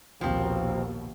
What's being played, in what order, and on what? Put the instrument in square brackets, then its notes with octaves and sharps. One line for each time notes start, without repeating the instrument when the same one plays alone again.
[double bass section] A#1 D#2 B2 [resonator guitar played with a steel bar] F3 C4